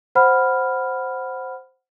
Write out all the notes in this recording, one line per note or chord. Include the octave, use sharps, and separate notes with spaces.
C5 F#5 B5 F6